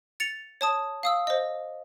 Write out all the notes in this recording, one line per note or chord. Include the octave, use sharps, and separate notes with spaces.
A6 C#7 F7
C#5 A5 D#6
F5 D#6 E6
C5 D#5